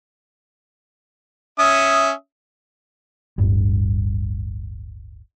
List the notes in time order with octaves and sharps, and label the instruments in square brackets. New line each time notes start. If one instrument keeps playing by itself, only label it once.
[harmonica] C#4 E5 D#6
[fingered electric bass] D1 G1 G2 G3